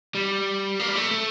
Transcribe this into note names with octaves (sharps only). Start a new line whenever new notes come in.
G3
A#3
G3
A3
A3